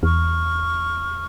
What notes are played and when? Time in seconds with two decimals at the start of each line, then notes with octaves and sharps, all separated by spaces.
0.03 E2 C#6 F6